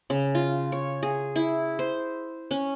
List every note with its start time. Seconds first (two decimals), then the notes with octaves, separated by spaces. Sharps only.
0.10 C#3
0.35 F4
0.72 C#5
1.03 G#4
1.36 E4
1.79 C5
2.51 C#4